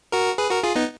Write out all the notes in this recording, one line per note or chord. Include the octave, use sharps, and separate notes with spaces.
F#4 A#4
G#4 B4
F#4 A#4
F4 G#4
B3 D#4